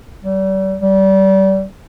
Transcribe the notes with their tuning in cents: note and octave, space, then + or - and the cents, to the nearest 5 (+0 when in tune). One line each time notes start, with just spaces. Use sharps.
G3 -40
G3 -30